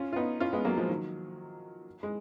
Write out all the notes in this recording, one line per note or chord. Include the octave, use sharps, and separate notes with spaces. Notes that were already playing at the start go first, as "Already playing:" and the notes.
Already playing: C#4 F4
F4
B3 D#4
C#4 F4
G#3 B3
F#3 A#3
F3 G#3
D#3 F#3
G#3